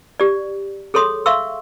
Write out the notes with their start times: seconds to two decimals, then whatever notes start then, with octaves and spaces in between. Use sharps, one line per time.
0.20 G4 D5
0.94 G#4 A4 C#5 C6 D#6
1.26 E5 F5 C6 C#6 E6